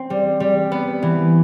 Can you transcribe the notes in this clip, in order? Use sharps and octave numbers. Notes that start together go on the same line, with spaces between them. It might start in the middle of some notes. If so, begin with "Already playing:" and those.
Already playing: C4
G3
G3
B3
E3